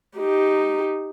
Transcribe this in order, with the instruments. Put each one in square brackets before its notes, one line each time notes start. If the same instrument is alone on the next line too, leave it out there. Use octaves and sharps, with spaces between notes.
[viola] D#4 G4